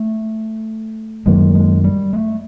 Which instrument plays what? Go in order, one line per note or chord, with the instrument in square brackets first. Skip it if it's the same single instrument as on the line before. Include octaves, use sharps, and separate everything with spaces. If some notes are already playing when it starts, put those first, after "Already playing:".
Already playing: [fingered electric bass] A3
[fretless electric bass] F#2 D#3 F#3 A#3 [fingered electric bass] G#3
[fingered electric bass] G#3
G3
A3